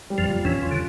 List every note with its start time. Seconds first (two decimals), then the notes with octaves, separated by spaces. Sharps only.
0.10 G3
0.18 F2 F3
0.27 A#2
0.44 E2 E3 C#4
0.62 F4
0.71 D3